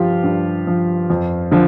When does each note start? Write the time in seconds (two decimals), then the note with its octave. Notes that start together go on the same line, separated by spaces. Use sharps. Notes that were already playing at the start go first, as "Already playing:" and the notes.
Already playing: G2 F3 F4 G4
0.23 G2
0.67 F3
1.10 F2
1.51 D3 F3